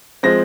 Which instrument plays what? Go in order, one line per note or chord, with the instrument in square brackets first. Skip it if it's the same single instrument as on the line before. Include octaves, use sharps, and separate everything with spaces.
[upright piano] F3 G#3 C4 A#6